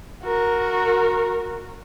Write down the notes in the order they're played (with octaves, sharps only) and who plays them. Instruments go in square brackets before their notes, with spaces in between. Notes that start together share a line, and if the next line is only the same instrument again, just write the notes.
[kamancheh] F#4 A#4